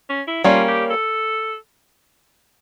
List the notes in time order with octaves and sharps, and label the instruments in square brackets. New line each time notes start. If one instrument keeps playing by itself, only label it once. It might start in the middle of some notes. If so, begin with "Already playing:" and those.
[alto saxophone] C#4
E4
[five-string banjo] G3 A#3 C#4 [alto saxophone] F4
[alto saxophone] G4
A4